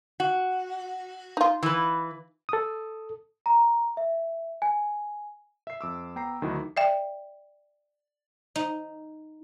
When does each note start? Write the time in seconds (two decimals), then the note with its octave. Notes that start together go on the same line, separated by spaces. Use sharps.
0.20 F#4
1.37 D#4 F4
1.63 E3 B4
2.49 A4 D#6
3.46 A#5
3.97 E5
4.62 G#5
5.67 E5 C7
5.81 F2 D6 E6
6.16 B3 G5 A#5 C7
6.42 D2 D#3 F#3 D#4 E4 F#4
6.77 D5 E5 G5
8.56 D#4